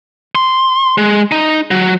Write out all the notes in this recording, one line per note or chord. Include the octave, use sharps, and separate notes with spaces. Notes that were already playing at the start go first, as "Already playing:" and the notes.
C6
G#3
D#4
F#3